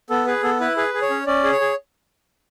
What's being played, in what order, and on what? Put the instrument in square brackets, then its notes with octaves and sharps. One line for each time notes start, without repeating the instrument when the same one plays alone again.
[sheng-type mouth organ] B3 A4
G#4 B4
B3 A4
E4 B4
G#4 B4
G#4
C#5
C#4
C#4 D5
G#4
C#5
G#4